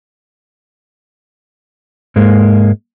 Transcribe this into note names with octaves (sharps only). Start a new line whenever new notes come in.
G#2 G#3 A#3